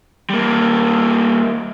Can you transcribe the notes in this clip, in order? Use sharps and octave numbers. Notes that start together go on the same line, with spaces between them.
G3 A#3